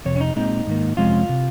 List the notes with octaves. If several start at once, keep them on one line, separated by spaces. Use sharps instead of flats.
F2 C3 C#5
C#4
D#4
A#2 G#3 C4 D#4
G#2 D#3 A#3
F2 C3 F3 G#3 C#4 F4
C3